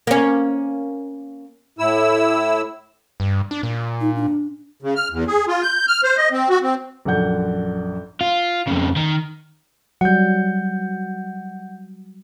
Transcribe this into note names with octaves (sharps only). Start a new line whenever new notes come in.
A#3 C#4
A2 E4 E6
G2
D4
A#2
D#4
D4
C#3
F6
E2
G#4
F4
G6
F6
C5
D#5
C4
F#4
C4
A#1 F#2 A4 D5 F#5 G6
F4
F2 C#3
D#3
F#3 G3 F#5 G6